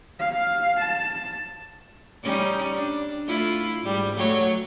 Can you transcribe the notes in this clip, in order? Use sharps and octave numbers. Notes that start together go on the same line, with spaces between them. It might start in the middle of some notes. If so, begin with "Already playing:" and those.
F5
A5
G3 C#4 D#4
D4
A3 E4 F4
G#2 G3
F#3 A3 C#5